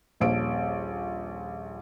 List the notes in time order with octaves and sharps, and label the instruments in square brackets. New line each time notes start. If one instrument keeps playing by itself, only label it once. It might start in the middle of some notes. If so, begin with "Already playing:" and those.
[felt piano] D#1 A#1 D7